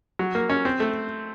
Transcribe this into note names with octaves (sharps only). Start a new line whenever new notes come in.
F#3
A#3
C#4
C4
A3